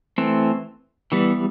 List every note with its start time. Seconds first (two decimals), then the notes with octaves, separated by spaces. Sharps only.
0.18 E3 A3 C4
1.12 E3 G3 B3